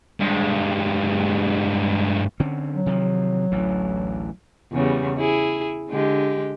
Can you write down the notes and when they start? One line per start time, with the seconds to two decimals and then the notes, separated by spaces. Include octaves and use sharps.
0.20 G2 G#3
2.40 D3 C4 C#4
2.73 F#3
2.86 C3 D#3 F3
3.52 A1 D2 E3
4.72 E2 C#3 G3
5.17 E4 G#4
5.90 D3 G#3 G4